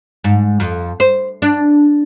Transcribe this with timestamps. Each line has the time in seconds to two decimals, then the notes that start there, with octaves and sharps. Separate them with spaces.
0.24 G#2
0.60 F2
1.00 C5
1.42 D4